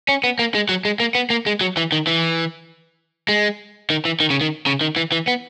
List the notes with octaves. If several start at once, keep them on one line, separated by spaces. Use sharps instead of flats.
C#4
B3
A#3
G#3
F#3
G#3
A#3
B3
A#3
G#3
F#3
E3
D#3
E3
G#3
D#3
E3
D#3
C#3
D#3
C#3
D#3
E3
E3
B3